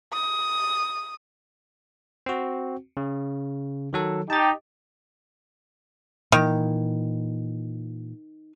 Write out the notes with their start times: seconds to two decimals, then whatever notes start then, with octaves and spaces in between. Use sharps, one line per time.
0.13 D#6
2.26 C4 F#4
2.97 C#3
3.93 D#3 F#3 A4
4.30 D#4 G4 A5 A6
6.32 A#2 D#3 E3